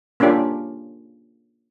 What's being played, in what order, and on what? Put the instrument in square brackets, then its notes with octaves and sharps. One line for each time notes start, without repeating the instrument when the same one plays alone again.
[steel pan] A#3 C#4 D4 F4 G4